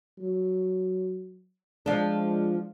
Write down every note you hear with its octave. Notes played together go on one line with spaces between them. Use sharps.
F#3
F3 G#3 D4